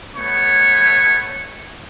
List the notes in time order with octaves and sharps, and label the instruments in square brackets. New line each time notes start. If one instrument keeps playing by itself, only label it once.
[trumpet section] A3 B3 C#5 C#6